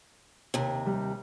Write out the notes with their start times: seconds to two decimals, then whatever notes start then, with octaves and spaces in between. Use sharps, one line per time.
0.54 D#2 C3
0.86 G3